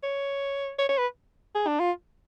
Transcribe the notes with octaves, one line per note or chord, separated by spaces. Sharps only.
C#5
C#5
C#5
B4
G#4
D4
F4